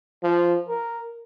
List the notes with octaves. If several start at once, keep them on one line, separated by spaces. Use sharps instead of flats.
F3
A#4